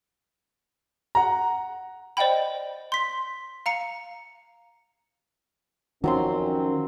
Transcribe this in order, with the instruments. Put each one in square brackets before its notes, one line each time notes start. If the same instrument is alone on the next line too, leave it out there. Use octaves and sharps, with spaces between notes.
[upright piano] F#5 A#5
[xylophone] C5 D5 D#5 F#5 G5 B5
C6 B6
F5 A#5 C#7
[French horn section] F2 C#4 [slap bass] D#3 [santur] F#3 C4 C6